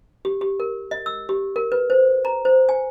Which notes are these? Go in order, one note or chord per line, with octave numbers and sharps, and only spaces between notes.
G4
G4
A#4
D#5
E6
G4
A#4
B4
C5
A#5
C5
G#5